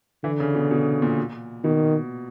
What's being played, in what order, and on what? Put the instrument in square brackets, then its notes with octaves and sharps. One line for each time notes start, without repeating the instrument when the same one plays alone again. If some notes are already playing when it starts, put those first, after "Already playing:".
[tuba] D3 [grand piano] E3
[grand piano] C#3
B2
B2
A#2
[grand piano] B2 [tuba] D#3